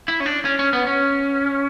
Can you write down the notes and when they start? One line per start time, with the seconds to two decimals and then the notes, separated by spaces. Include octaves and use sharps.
0.08 E4
0.20 C#4
0.26 D4
0.45 C#4
0.59 C#4
0.73 B3
0.87 C#4